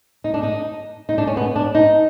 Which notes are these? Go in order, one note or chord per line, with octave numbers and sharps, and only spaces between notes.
D#4
D4
D#4
D#4
D4
C#4
B3
D4
D#4